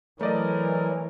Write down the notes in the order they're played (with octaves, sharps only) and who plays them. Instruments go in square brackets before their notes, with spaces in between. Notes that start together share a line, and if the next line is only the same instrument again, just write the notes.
[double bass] E3 [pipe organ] F#3 [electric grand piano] A3 D5 D#5 [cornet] A#4